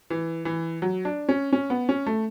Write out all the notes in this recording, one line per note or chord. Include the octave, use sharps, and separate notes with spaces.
E3
E3
F#3
D4
C#4
C#4
B3
C#4
A3